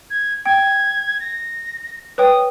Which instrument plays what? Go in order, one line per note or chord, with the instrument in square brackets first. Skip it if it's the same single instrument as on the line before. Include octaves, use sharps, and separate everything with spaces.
[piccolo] G#6
[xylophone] G5 [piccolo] G#6
[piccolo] A#6
[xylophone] B4 C#5 G5 [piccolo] D#6